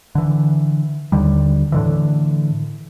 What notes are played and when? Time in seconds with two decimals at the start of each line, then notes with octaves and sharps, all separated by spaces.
0.15 D3 E3
1.12 D#2 D3 G3
1.72 A2 D3 E3